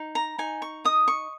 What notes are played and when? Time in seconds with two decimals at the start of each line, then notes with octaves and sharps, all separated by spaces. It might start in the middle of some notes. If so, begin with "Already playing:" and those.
Already playing: D#4
0.15 A#5
0.38 D#4 G#5
0.62 C#6
0.85 D#5 D#6
1.08 C#6